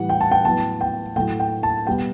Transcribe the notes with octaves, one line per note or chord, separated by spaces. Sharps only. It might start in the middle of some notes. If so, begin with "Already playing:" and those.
Already playing: A2 E3 G3 F#5
G5
A5
G5
A2 F#3 B3 A5
G5
A2 F#3 A3 G5
G5
A5
B2 G3 B3 G5